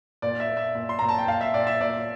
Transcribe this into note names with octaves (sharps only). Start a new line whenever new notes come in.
A#2 D5
E5
A#2
E5
A#2
C6
A#2 A#5
A5
G5
A#2 F5
E5
A#2 D5
E5
A#2 D5